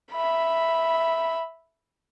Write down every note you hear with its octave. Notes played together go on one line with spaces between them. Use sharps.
E5 B5